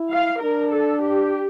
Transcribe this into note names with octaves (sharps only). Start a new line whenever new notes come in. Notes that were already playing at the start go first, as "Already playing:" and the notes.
Already playing: E4
F5
D4 A#4
A4
G4